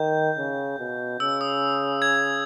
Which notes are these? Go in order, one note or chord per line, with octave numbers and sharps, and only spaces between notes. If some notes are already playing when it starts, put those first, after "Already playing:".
Already playing: D#3 G6
C#3
B2
C#3 E6
D#6
G#6